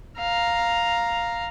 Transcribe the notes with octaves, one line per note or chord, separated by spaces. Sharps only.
F5 A#5